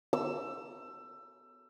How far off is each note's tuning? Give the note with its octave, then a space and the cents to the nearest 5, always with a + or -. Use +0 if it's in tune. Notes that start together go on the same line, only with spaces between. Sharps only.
E6 +20